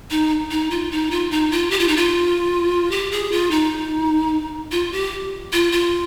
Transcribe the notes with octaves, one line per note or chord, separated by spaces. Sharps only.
D#4
D#4
F4
D#4
F4
D#4
F4
G4
F4
D#4
F4
G4
G#4
F4
D#4
F4
G4
F4
F4